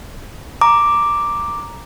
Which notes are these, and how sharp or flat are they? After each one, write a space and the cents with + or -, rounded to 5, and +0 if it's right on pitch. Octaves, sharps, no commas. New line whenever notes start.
A#5 +0 D6 +0